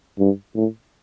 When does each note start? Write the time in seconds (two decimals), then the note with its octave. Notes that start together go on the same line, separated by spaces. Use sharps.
0.19 G2
0.55 A2